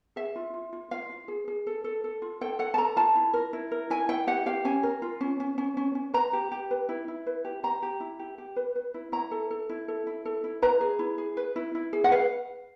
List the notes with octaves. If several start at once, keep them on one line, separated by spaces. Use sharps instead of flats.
G#4 E5
F4
F4
F4
F4 F5
F4
G#4
G#4
A4
A4
A4
F4
A4 G5
A4 F#5
A5
A4 A#5
F4 A5
E4
A#4
E4
A#4
E4 G#5
E4 G5
G4 F#5
G4 F5
C#4 G#5
A#4
F4
C#4
C#4
C#4
C#4
C#4
B4 A#5
G4
G4
B4
E4
E4
B4
G4
G4 A#5
G4
E4
G4
G4
B4
B4
E4
E4 A#5
A4
A4
E4
A4
E4
A4
E4
B4 A#5
G#4
E4
G#4
B4
E4
E4
G#4
F#5
B4 F5